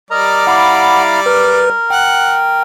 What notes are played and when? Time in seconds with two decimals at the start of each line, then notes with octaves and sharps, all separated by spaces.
0.11 G3 A#4 D5 D#5 A#5
0.47 E4 F5 F#5 A#5 B5 D6
1.26 A#4 B4
1.90 F#5 G5